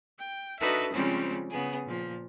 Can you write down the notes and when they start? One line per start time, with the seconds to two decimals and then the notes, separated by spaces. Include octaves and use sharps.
0.18 G5
0.59 D4 D#4 F#4 A4 B4 E5
0.92 C#3 F3 G3 G#3 C4 C#4
1.50 C#3 B3 G#4
1.86 A#2 F3